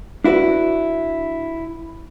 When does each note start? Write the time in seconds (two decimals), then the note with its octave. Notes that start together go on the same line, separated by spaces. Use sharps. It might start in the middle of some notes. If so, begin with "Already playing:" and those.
0.24 D4 E4 F#4 B4